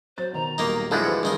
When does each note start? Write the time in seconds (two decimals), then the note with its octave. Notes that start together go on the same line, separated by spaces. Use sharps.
0.18 F#3 C5 A6
0.33 B2 D#3 A#5
0.58 D#1 B1 D#3 A#3 D#4
0.91 D3 E3 F3 G#3 A3 D4
1.03 D2 B4 C5 C#7
1.23 G2 D#3 E3 D#4 G#4 A#4